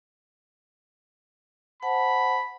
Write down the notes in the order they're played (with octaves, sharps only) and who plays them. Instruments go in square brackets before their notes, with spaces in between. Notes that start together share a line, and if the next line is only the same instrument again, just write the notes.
[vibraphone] C5 F#5 A5 [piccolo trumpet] B5